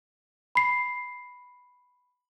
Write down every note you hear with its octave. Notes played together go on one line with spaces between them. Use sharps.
B5 C7